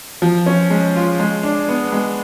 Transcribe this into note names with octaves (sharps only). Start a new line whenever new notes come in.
F3
C#4
G#3
F4
G#3
D4
B3
G#3